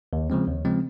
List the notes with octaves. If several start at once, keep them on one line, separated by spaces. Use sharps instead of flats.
D#2
C#3 F3 G#3 C4
D#2
C#3 F3 G#3 C4